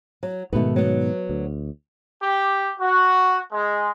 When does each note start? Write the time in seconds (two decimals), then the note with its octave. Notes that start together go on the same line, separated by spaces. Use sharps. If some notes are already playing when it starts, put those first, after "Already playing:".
0.23 F#3
0.53 G#2 B2 D#3 A3 B3
0.76 F#3 B3
1.29 D2
2.22 G4
2.80 F#4
3.52 G#3